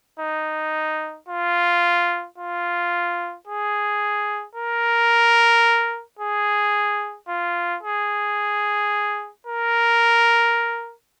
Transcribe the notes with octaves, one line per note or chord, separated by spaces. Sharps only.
D#4
F4
F4
G#4
A#4
G#4
F4
G#4
A#4